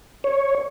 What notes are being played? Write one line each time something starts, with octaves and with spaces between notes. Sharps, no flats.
C#5